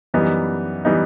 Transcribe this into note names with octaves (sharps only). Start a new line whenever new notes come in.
F#2 E3 G3 B3 D#4
E3 G3 B3 D#4